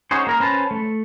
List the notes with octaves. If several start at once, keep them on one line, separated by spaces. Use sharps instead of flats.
C#4 D#4 F#4 G#4 C5
A#3 A#4 A#5
C#4 B4 C5 A5
A3